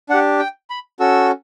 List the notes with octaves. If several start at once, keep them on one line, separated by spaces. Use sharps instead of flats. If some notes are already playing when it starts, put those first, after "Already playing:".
D4 G4 F#5
G5
B5
C#4 F#4 A4 E6